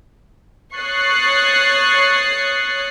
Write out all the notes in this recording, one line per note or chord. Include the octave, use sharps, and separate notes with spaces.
C#5 C#6 D#6 F#6 A6 C7